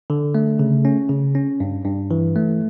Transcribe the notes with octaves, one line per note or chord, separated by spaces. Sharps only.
D3
A3
C#3
C#4
C#3
C#4
G2
G2
E3
A3